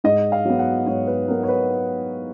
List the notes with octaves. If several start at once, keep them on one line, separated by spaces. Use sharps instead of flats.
G#2 D#5
F5
F#3 B3
F#5
G#2 C#5
B4
F#3 B3 A#4
C#5
B4